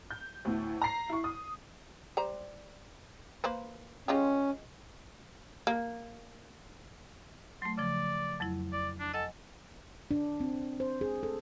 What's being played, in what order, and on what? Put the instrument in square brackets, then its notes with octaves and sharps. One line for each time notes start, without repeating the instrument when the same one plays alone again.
[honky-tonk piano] G6
D2 A2
A#5 C7
E4 C#6
D#6
[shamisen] G3 C5 A#5
A#3 B4 C5
[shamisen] G#3 F4 G4 [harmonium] C#4
[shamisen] A#3
[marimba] F#3 A3 [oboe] C6
[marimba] C#3 F3 [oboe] D5
[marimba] F2 F#3 E4
[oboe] D5
D4
[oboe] A4 [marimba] D#5 F#5 G#5
[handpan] D4
C4
C5
G#4
A4